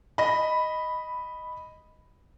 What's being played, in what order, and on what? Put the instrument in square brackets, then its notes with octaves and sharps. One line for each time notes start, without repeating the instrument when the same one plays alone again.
[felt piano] D#5 B5